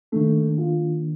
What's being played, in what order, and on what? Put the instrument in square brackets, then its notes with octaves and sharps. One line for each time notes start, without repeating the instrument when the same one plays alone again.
[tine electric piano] D#3 A#3 D4 [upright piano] A3
[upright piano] F4